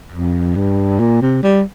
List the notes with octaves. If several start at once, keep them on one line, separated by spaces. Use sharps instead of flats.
F2
G2
A#2
C3
G3